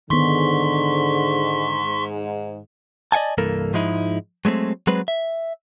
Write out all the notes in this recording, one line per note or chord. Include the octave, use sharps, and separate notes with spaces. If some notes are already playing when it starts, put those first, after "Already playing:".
G#2 D3 D#3 B3 C6 C#6 B6
D5 D#5 F#5 G#5 A5
C2 G2 E3 A#3 A4 A#4
G#2 F3 G#3 D#4 E4
F#3 G#3 A3 C4
F#3 G#3 C4 B4
E5